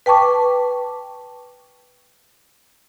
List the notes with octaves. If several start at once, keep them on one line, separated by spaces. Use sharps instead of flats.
B4 G5 A5 C#6 D6